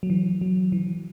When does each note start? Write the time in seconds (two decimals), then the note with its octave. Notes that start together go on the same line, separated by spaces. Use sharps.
0.03 F#3
0.10 E3
0.41 F#3
0.72 E3